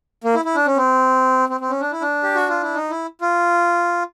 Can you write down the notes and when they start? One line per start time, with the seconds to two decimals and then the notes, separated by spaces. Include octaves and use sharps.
0.24 A#3
0.35 E4
0.45 E4
0.55 D4
0.67 C#4
0.77 C4
1.49 C4
1.60 C4
1.70 C#4
1.81 D4
1.92 E4
2.01 D4
2.23 G4
2.35 F#4
2.49 F4
2.62 E4
2.75 D#4
2.90 E4
3.21 F4